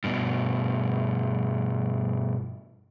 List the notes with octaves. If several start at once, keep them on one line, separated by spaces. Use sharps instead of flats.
G2 B2